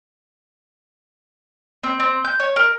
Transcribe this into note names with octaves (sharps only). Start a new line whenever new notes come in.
C4
C4
G6
C#5
A#4